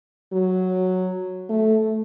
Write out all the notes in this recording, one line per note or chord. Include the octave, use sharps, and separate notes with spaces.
F#3
A3